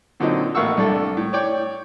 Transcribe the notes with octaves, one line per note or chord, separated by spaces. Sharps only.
A#2 D3 F#3 C4 D#4
A1 A#3 F5 F#5 C#6 E6
C2 D4 A4
A2
C#5 D5 G5